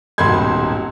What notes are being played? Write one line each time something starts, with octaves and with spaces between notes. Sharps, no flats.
D#1 G#1 B2 B5 C6 G#6